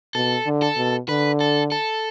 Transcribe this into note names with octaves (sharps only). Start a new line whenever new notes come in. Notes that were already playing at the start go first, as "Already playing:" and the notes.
B2 A4
D3
A4
B2
D3 B4
A4
A4